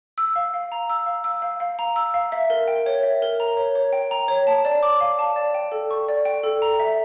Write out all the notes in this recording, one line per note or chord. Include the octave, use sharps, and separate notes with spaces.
E6
F5
F5
A#5
E6
F5
E6
F5
F5
A#5
E6
F5
E5
A#4
G5
C#5
E5
A#4
A#5
C#5
C#5
G5
A#5
C#5
A5
D5
D6
F5
A5
D5
G5
A4
C#6
D5
G5
A4
A#5
E5